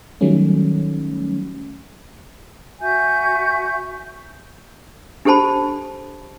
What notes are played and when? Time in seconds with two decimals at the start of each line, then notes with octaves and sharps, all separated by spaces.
0.21 D#3 F#3 G3 A3 C#4
2.81 F#4 E5 G#5 G6
5.25 D4 G4 A4 C5 A5 B5